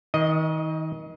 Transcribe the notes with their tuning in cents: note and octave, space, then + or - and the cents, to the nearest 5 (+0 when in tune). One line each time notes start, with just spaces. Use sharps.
D#3 +35 D#5 +0